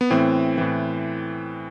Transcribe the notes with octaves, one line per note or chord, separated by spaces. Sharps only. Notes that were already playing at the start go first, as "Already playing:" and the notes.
B3
A2 E3 C4
A2 E3